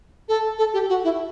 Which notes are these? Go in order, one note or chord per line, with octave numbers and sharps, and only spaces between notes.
A4
A4
G4
F#4
E4